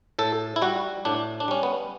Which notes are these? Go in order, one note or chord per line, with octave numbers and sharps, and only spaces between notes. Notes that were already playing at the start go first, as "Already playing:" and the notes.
A2 A4
E4
G3 F#4
A2 D4
D4
G3 C#4
B3